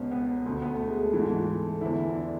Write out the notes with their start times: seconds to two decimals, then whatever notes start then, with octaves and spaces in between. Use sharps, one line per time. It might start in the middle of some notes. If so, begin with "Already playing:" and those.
Already playing: C#2 B2 C#4
0.11 B3
0.45 D2 D3 A3
0.62 B3
0.75 A3
0.88 G#3
1.01 A3
1.13 E3 A3
1.17 G#2
1.31 A3
1.47 A3
1.81 E2 D3 E4
2.15 D4